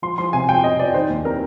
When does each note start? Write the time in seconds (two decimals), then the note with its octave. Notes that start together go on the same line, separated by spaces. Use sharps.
0.02 F3 C6
0.18 F3 C6
0.33 C3 G#5
0.48 F2 G5
0.64 C3 D#5
0.79 F2 D5
0.94 D#3 C5
1.10 D#2
1.25 C4 A#4